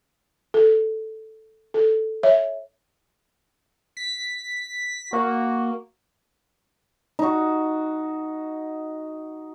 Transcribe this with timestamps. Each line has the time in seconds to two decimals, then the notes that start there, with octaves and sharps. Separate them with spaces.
0.54 A4
1.74 A4
2.23 C#5 E5
3.97 B6
5.13 A#3 F#4
7.19 D#4 F#4